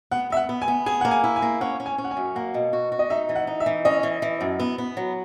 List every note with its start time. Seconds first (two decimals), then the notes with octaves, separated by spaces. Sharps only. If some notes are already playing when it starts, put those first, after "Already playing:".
0.11 B3 F#5
0.30 B3 E5
0.37 F#5
0.49 B3
0.62 G#5
0.68 B3
0.86 G#4 G#5
1.01 A#3 F#5
1.11 G#5
1.24 E4
1.36 G#5
1.42 A#3
1.61 C#4 F#5
1.80 C#4
1.86 G#5
1.98 C#4
2.04 F#5
2.11 G#5
2.17 F#2
2.36 A#3 F#5
2.54 B2
2.73 F#4
2.92 F#4
2.99 D#5
3.10 D#4 E5
3.29 E3
3.35 F#5
3.47 D#4
3.60 E5
3.66 E3
3.85 C#4 D#5
4.03 E3
4.22 E3
4.41 F#2
4.60 B3
4.78 B3
4.97 F#3